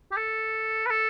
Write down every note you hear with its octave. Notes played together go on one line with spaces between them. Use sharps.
G4
A4
B4
A4